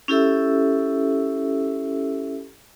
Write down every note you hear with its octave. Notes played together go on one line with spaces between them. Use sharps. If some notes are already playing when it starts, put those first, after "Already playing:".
C#4 E4 G4 A4 E5 E6